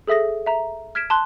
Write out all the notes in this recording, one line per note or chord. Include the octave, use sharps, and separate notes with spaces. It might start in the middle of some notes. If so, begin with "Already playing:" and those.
G#4 A4 E5 D#6 A#6
E5 A#5
F6 G#6 B6 D7 E7
A5 C6 F#6